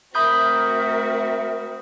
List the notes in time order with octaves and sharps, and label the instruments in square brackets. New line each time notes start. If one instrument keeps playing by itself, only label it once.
[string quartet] A3 C4 F#4 [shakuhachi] A#4 [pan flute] E5 [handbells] B5 D#6 G6